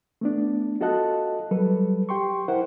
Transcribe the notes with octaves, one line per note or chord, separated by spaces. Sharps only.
A3 B3 D4
F4 F#4 A4 D#5 A5 F#6
F#3 G3 A4 B4
G4 G5 C6 C#6
E4 A#4 C5 F#5